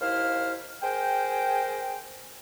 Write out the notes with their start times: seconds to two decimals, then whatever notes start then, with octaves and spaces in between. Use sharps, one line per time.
0.01 D#2 E4 C5 F5 F6
0.83 G#4 A#4 C5 G5